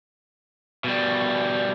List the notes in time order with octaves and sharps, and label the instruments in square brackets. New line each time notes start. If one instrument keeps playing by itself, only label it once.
[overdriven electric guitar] B2 G3